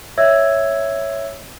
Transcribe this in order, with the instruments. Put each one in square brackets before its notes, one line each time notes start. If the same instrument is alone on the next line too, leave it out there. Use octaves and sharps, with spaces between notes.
[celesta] C#5 D#5 E5 E6 G#6